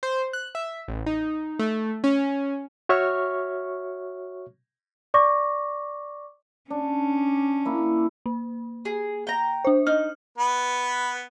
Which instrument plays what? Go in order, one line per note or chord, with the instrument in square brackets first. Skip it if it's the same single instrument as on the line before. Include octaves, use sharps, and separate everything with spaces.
[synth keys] C5
F#6
E5
A1
D#4
A3
C#4
[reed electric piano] F#4 C#5 E5 C#6 F6
[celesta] D5 C#6 D6 A#6
[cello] C#4 [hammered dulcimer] D4
[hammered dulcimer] A#3 E4
[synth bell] A#3
[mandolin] G#4
G5 A#5
[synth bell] D4 C5
[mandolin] D#4 [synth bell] F6
[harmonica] B3 B4